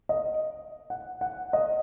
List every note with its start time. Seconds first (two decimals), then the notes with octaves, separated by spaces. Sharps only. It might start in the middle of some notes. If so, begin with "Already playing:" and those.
0.09 D#5
0.90 F#5
1.21 F#5
1.53 D#5